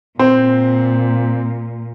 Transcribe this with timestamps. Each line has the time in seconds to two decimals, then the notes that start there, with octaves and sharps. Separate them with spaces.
0.19 A#2 C4